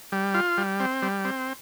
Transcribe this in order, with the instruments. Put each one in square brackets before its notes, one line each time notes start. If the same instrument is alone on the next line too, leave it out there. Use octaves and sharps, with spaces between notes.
[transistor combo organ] G3
F4
G3
C4
G3
C4